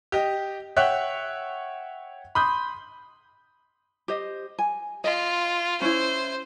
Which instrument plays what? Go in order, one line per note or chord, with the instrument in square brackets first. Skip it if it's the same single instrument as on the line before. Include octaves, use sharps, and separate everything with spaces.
[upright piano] G4 D#5
C#5 E5 F#5 G5 F#6
B5 C6 D#6 G6
[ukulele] G4 C5 D#5
G#5
[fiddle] F4 [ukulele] D#5
[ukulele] C#4 E4 [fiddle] C5